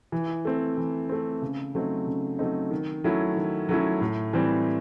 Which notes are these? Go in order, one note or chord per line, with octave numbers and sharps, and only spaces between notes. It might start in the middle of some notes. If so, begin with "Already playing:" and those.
E3
A3 C4
E3
A3 C4
C#3
F#3 A3 C4 D#4
C#3
F#3 A3 C4 D#4
D#3
F#3 A3 C#4 E4
D#3
F#3 A3 C#4 E4
A2
E3 G3 C4